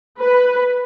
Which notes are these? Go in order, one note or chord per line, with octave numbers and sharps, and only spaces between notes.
B4